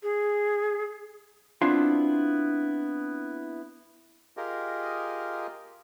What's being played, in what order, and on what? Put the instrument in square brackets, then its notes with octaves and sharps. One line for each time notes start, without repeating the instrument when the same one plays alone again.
[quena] G#4
[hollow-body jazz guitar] B3 C4 D4 E4 F4
[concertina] F4 G4 G#4 A#4 D#5